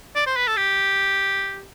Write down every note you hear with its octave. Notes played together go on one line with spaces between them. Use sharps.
D5
C5
B4
A4
G4